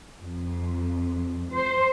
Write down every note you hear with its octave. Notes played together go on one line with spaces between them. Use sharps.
F2
C5